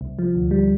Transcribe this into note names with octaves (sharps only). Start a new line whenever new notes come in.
C2
F3
D2
G3